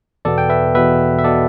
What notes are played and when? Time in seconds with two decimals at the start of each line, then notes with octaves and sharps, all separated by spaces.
0.25 E2 B2 B3 A4 D5
0.38 G5
0.49 B4 E5
0.74 E2 B2 B3 B4 E5
1.19 E5
1.24 B2 B3 A4 D5